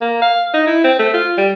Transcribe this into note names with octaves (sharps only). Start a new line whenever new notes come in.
A#3
F5
D#4
E4
C4
A3
F4
G3